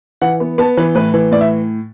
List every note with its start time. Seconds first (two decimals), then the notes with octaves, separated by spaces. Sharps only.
0.22 E3 F#5
0.40 B3
0.58 B3 A5
0.77 E3 B4
0.95 A2 B4
1.14 E3
1.32 A2 D5
1.41 E5